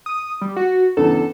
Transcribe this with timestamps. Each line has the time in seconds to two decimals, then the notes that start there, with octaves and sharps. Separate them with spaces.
0.06 D#6
0.41 G3
0.56 F#4
0.97 E2 G2 C#3 A4